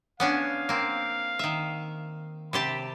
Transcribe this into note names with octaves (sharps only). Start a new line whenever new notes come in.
B3 C#4 D4 F5
A#3 C4
D#3 E5
C3 G4 A5 B5